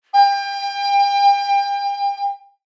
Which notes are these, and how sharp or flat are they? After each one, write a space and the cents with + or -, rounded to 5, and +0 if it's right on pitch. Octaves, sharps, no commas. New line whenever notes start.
G5 +30